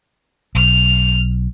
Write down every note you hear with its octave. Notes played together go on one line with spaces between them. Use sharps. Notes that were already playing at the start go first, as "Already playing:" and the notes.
B1 F6